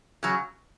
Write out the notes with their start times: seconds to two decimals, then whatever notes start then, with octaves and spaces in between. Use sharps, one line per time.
0.23 C#3 F#3